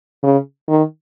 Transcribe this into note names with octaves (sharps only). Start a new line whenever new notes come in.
C#3
D#3